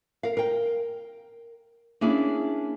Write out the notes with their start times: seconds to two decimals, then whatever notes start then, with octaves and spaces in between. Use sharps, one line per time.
0.23 A#4 F5
0.37 A#4 G5
2.01 A#3 C#4 D4 E4 G#4